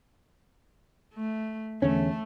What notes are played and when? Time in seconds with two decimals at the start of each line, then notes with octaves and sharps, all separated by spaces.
1.14 A3
1.82 E2 D3 A3 C#4 A4